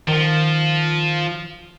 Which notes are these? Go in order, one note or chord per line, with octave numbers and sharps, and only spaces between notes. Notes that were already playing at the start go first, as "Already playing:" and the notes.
D#3 F3